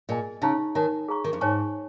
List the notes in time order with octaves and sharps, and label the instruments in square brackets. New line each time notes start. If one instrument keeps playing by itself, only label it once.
[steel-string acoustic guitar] A#2 [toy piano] G#4 D#5 G#5
[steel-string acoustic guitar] C#3 [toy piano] D#4 C#5 F5 A#5 C#6
[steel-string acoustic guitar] D#3 [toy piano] D#4 C#5 G#5
[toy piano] G#4 F5 A#5 C#6
[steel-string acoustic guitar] D#3
F2
[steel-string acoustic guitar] G#2 [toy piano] D#4 C#5 G#5 C#6